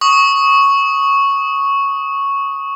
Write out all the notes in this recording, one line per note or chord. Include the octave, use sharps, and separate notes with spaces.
C#6 D#6